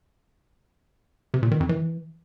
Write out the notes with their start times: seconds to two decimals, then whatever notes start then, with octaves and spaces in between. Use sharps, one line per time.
1.34 C3
1.43 A#2
1.51 D#3
1.60 F2
1.69 E3